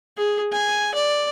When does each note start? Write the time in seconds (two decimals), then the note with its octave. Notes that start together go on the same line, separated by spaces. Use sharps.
0.17 G#4
0.52 G#5
0.94 D5